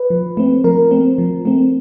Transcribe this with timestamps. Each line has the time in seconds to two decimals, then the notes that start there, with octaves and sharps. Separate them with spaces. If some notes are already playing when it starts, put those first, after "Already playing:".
Already playing: B4
0.10 F3
0.37 A3 C4
0.64 F3 A#4
0.91 A3 C4
1.18 F3
1.45 A3 C4